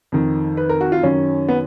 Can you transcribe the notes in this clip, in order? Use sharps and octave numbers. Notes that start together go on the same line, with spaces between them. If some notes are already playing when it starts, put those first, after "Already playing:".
F2 D#3
B4
A#4
F#4
F4
F#2 D#3 C#4
B3